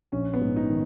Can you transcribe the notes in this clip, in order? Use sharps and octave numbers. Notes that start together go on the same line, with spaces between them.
A#1 C#4
B3
G#2
D#4
D#3